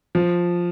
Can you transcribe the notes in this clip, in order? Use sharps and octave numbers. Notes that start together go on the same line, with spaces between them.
F3